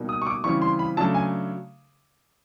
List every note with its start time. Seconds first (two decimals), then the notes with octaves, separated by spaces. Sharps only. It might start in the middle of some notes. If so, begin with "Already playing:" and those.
Already playing: B2 G3 A#3 D#4
0.09 D#6
0.22 C#6
0.27 D6
0.44 C#3 E3 G3 C4 C#6
0.62 C6
0.79 B5
0.97 C#3 F#3 A3 D4 A5
1.14 G#5